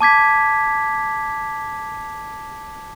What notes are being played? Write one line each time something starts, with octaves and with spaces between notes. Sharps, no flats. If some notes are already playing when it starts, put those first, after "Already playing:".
A5 D6 G#6 B6